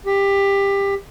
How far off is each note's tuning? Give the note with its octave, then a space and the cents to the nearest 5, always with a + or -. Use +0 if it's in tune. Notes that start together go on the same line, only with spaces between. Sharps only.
G4 +20